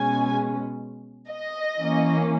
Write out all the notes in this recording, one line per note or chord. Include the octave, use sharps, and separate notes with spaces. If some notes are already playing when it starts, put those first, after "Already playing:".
Already playing: B2 G#3 C#4 G#5
D#5
E3 A#3 C#4